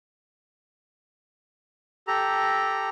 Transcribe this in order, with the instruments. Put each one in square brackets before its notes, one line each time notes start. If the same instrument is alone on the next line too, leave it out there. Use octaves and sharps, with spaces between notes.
[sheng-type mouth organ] G4 A4 A#5